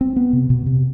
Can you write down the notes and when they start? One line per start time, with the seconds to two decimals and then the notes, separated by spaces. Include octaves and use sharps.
0.01 C4
0.16 B3
0.33 C3
0.50 B2
0.66 C3